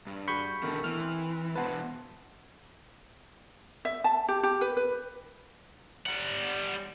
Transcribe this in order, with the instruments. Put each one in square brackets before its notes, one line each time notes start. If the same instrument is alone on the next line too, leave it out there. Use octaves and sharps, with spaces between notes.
[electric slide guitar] G2
[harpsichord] F#4 G#4 [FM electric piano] B5 C#6 G6
[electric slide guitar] B2 D3 [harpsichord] D#3 A3
[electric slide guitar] E3 [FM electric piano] F6
[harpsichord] C4
[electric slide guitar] E2 B2 [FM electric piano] B4 F#5 [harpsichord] C5 G#5 A5
[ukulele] E5
A5
G4
G4
B4
B4
[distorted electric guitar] G3 F#5